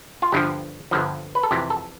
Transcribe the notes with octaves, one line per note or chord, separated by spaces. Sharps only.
F4
G1 G2 D3 F3 G4
G1 G2 D3 F3
B4
A4
F2 C3 E3 G4
A4